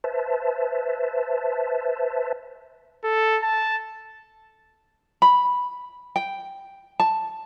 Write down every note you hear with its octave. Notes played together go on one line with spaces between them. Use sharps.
B4 C5 E5 A5
A4
A5
B5
G5
A5